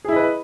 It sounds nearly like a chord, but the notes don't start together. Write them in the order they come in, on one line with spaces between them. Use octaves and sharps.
G#4 E4 D#5 B4